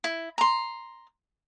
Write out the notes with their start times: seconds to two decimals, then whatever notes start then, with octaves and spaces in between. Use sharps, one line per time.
0.04 E4
0.38 A#5 C6